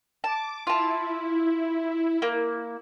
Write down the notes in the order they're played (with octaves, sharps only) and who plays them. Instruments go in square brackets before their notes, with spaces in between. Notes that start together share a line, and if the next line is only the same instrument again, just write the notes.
[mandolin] A5 [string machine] D6
[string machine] E4 [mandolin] F4 A5
[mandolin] A#3